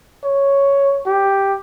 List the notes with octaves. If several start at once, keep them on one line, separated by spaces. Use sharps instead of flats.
C#5
G4